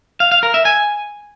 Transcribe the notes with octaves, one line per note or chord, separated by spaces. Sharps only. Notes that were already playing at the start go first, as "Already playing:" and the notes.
F5
F5
A#4
E5
G#5